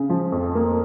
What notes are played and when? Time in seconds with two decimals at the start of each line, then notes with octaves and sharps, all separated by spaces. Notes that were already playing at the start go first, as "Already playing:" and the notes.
Already playing: C#3
0.10 F3
0.32 F2
0.55 A#3